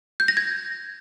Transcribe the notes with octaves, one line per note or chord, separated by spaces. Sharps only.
G6
A#6
G#6